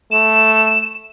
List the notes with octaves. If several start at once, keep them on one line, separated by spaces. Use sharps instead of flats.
A3 E7